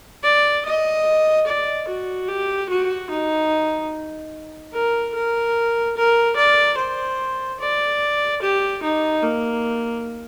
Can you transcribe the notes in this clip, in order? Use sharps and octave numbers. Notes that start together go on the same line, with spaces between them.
D5
D#5
D5
F#4
G4
F#4
D#4
A#4
A#4
A#4
D5
C5
D5
G4
D#4
A#3